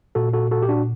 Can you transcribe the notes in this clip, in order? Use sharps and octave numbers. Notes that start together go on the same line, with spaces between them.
A#2 F#4 A4
F#4 A4
F#4 A4
G4
D4 F#4